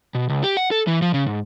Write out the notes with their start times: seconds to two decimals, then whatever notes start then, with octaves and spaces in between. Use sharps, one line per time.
0.15 B2
0.29 C#2
0.44 G4
0.57 F#5
0.71 A4
0.87 E3
1.02 F3
1.14 C#3
1.27 G#2